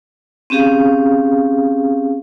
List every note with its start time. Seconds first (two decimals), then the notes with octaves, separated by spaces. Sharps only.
0.50 C4 C#4 G4 G#4 F5